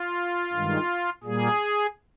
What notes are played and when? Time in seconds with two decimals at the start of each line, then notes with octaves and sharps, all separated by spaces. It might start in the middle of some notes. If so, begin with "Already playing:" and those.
Already playing: F4
0.53 G2 D#3 G#3
1.23 A#2 G3 A#3 G#4